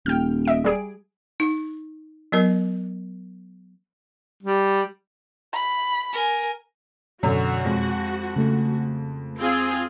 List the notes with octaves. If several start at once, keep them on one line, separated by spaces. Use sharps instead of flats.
D#1 G5 F6
D#5 E5 D7
G3 G#4 D7
D#4
F#3 B3 A#4 D#5
G3
B5
A#4 G#5
F#2 B2 D3 F#4
F2 G#3
C#3 A3
C4 F4 G#4